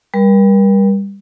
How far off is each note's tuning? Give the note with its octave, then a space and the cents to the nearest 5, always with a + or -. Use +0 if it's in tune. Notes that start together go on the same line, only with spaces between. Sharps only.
G3 +20 A#4 +40